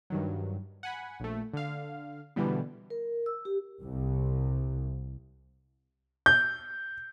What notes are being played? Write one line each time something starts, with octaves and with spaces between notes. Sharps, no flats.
G2 D#3 F#3
F#5 G#5 B5
A#1 A3
D3 F5
B2 D3 E3 G3 B3
A#4
E6
G4
C2
G6